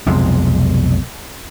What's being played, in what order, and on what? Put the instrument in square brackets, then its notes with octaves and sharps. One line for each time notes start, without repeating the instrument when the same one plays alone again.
[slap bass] B1 F2 C3 G#3